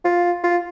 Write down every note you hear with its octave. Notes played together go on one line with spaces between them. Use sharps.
F4
F4